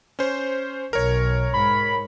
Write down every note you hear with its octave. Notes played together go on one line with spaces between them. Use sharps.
C#4 C5
B1 A#4 C#5
G#2 B5